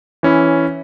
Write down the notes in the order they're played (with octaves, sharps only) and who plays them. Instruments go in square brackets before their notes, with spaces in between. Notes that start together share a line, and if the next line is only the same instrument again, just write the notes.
[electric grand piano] E3 C#4 E4